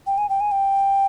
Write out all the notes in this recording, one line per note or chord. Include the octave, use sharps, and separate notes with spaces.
G5
G#5
G5
G#5
G5